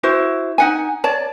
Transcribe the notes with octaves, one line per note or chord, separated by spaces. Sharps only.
E4 F#4 C5
D#4 F#5 G#5
C#5 D5 A5